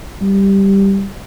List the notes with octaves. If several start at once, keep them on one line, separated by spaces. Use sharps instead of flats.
G3